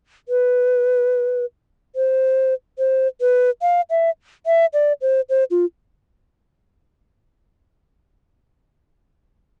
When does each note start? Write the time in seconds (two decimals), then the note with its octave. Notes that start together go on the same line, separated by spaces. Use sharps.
0.29 B4
1.96 C5
2.78 C5
3.21 B4
3.62 F5
3.90 E5
4.46 E5
4.73 D5
5.02 C5
5.29 C5
5.51 F4